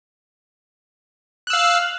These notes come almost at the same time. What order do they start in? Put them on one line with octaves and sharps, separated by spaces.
F#6 E6 F5